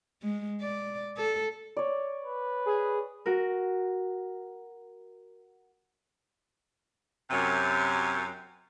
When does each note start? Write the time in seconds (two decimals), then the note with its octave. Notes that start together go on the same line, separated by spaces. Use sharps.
0.23 G#3
0.62 D5
1.17 A4
1.77 C#5 D5
2.24 B4
2.66 G#4
3.26 F#4 A#4
7.30 F#2 C3